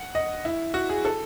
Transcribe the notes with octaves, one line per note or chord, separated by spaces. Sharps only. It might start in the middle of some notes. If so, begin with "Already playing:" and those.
Already playing: F#5
D#5
E4
F#4
G#4
A4